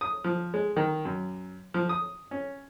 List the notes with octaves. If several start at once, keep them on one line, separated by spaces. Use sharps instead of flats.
D#6
F3
G#3
D#3
F#2
F3
D#6
C#4